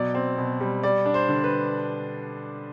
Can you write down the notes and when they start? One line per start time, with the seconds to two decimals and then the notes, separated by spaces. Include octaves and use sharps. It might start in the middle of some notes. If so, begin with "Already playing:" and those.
Already playing: B2 F#3 D5
0.15 C4
0.38 B2
0.61 G3
0.83 G3 D5
1.06 D4
1.14 C5
1.29 D3
1.44 B4